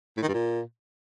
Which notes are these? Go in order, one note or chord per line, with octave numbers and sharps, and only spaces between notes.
A2
D#3
G2
A#2